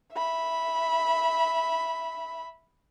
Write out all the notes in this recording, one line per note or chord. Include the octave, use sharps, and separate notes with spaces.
E5 B5